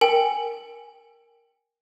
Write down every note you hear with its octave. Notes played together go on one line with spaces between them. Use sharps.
A#4 G5 G#5